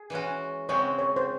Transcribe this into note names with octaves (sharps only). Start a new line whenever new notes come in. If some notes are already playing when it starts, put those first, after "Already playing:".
Already playing: G#4
E3 G#3 C#4 F#4
C#3 G#3 C4 F#4 C#5
C#5
C5